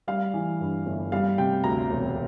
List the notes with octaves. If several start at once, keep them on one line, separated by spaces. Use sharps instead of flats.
G3 F5
E3
G2
G1
G3 F5
C3 G5
D2 A#5
E1